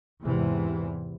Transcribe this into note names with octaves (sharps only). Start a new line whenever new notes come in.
E2 G#2 C3 E3